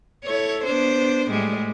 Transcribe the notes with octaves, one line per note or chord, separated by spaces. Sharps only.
E4 A4 C#5
B3 D4 C5
A2 G3 G#3